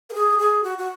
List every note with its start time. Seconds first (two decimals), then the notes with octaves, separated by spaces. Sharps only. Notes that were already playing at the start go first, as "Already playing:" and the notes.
0.10 A#4
0.14 G#4
0.39 G#4
0.64 F#4
0.78 F#4